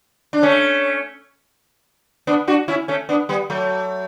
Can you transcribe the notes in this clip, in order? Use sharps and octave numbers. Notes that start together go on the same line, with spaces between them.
D4
A3 C#4
B3 D4
D4 F#4
C#4 E4
A3 C#4
B3 D4
G3 B3
F#3 A3